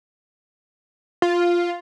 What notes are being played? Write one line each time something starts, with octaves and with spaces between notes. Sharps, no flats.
F4